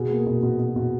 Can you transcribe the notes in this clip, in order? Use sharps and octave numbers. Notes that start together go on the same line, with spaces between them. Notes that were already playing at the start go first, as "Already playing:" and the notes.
Already playing: B2 G#4
A#3
B2
B2
B2
B2